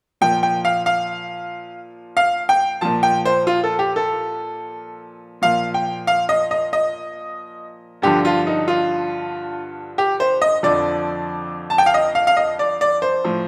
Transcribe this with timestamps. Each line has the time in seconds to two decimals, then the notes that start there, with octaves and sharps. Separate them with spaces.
0.21 A#2 F3 G5
0.43 G5
0.65 F5
0.86 F5
2.17 F5
2.49 G5
2.81 A#2 F3 A5
3.03 G5
3.25 C5
3.47 F4
3.64 A4
3.79 G4
3.96 A4
5.42 A#2 F3 F5
5.74 G5
6.07 F5
6.29 D#5
6.51 D#5
6.73 D#5
8.02 G2 D3 F3 G4
8.25 F4
8.47 D#4
8.68 F4
9.98 G4
10.20 C5
10.42 D#5
10.63 F2 D3 F3 D5
11.70 A5
11.78 G5
11.86 F5
11.94 D#5
12.15 F5
12.27 F5
12.37 D#5
12.59 D5
12.81 D5
13.02 C5
13.24 A2 F3